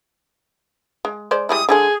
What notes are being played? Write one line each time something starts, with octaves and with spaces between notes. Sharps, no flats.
G#3
G#3 C5 D5
G3 G#3 E4 D#6
D3 G3 G#3 G#4